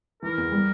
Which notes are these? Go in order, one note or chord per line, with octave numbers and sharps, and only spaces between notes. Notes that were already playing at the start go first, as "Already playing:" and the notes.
E3 A#4
E2
G3